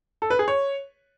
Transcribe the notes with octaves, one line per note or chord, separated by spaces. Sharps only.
A4
B4
G#4
C#5